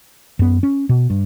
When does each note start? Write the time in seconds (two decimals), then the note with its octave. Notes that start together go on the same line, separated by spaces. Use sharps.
0.39 F#2 B3
0.63 C#4
0.89 B2
1.10 G2